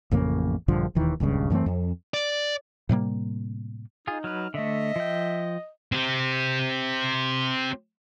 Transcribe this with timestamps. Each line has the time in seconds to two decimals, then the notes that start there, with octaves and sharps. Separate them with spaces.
0.11 A1 F2 C#3 A#3
0.68 A#1 G2 D3 F3
0.95 E1 D#2 D#3 E3
1.20 D#1 C#2 G2 C#3
1.50 F#2 E3 A3 C4
1.66 F2
2.14 D5
2.89 A2 C3 G3 A#3
4.07 D#4 F4 G#4
4.24 F#3 B4 F6
4.54 D3 A3 D#5 E5
4.96 F3 G5
5.92 C4 G4